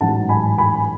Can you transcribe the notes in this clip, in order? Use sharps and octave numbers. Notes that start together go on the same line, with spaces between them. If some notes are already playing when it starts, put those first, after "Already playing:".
A1 G#2 F#3 F#5 A5
G#5 B5
G#5 B5